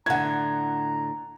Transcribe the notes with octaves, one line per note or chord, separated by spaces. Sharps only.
A2 D3 F#5 A#5 G#6